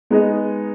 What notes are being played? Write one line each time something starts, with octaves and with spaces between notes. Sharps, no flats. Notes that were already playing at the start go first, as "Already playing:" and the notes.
G#3 B3 D#4 G#4 D#5